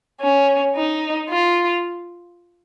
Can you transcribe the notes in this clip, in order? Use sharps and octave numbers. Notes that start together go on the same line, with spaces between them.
C#4
D#4
F4